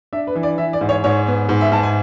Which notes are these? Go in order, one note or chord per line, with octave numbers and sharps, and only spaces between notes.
D4 E5
B4
E3
D5
E3 E5
D5
G#2
C#5
G#2 C#5
B3
G#2
E5
G#2 A5
G#5